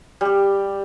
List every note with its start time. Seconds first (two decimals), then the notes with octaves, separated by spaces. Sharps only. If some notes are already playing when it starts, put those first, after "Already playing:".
0.21 G3 G4